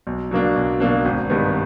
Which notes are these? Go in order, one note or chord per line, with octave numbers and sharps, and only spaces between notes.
B1
B2 F#3 A#3 D4
B1
B2 F#3 A#3 D4
G#1
G2 D#3 G3 B3